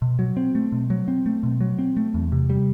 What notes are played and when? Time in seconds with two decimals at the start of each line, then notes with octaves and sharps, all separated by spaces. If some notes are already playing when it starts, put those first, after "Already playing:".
0.02 B2
0.19 F#3
0.37 C4
0.55 A3
0.72 B2
0.90 F#3
1.08 C4
1.26 A3
1.43 B2
1.60 F#3
1.79 C4
1.97 A3
2.14 E2
2.32 C3
2.50 G3